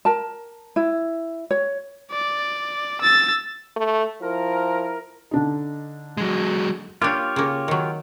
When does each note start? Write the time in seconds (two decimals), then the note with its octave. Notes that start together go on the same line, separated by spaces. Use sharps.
0.05 A#4 A5
0.76 E4
1.51 C#5
2.12 D5
3.01 E6 A6
3.77 A3
4.21 F3 E4 A#4
5.31 D3 D4 D#4
6.17 F#3 G#3
7.02 A#3 D4 F4 G4 C#5
7.36 C#3 A#3
7.68 D#3 F#3